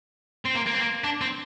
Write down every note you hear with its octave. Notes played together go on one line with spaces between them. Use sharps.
C4
A#3
A#3
C4
A#3
D4
C4